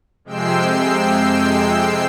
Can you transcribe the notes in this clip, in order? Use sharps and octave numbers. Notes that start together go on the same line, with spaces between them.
F2 C3 G#3 G5 E6 C7